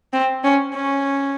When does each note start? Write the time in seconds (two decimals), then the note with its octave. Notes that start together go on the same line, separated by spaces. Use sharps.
0.13 C4
0.44 C#4
0.74 C#4